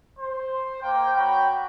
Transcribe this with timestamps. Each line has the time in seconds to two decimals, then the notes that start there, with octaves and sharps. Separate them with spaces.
0.19 C5
0.83 A#3 G5
1.17 F#4 C#5 G5 B5